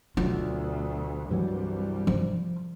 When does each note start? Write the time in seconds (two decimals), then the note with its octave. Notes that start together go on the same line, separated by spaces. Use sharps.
0.17 D2 B2 F#3 F4
1.31 C2 G2 E3 F#3 G3
2.07 F3